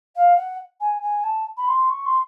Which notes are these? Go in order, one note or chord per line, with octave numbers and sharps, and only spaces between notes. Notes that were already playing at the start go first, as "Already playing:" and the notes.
F5
F#5
G#5
G#5
A5
B5
C6
C#6
C6